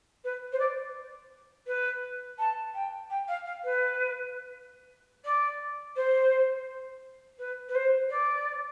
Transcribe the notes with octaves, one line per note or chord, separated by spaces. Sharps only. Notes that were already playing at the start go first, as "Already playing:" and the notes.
B4
C5
D5
B4
A5
G5
G5
F5
F5
B4
D5
C5
B4
B4
C5
D5